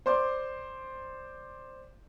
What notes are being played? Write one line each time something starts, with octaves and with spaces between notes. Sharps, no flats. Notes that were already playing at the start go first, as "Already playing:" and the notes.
C5 D5 C6 D6